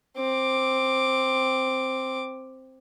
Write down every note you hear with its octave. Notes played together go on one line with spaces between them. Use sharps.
C4 D6